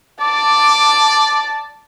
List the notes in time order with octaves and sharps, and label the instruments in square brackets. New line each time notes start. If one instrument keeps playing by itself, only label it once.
[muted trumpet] D5 [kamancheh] A5 [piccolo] D6